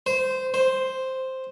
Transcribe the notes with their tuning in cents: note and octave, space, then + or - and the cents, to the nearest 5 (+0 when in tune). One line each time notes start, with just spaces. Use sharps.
C5 -15
C5 +0